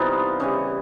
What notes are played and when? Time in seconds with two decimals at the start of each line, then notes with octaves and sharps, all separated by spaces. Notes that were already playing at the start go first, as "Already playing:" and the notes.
Already playing: C3 E3 G3 B3 D#4 F4
0.40 C#3 E3 G3 C#5 D#5